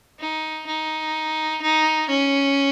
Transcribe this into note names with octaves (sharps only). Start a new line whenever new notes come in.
D#4
D#4
D#4
C#4